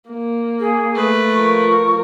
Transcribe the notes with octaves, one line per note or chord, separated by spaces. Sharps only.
A#3
G#4
A3 B4
F3 A#4 C#6